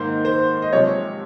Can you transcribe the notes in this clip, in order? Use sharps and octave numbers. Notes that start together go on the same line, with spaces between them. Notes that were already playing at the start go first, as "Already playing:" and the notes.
Already playing: G#2 D#3 A#3 C5
C5
D#5
C3 F3 G#3 C#5